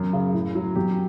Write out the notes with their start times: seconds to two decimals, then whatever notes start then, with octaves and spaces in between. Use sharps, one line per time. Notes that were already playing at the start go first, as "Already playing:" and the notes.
Already playing: F#2
0.13 C#3
0.33 A2
0.55 F#3
0.75 F#2 G4